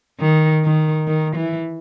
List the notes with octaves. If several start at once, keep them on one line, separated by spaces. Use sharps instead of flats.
D#3
D#3
D#3
E3